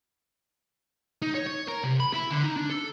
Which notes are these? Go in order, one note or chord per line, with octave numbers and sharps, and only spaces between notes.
D#4
C#5
C#5
A#4
C3
B5
E4
D3
D#4
D4
A4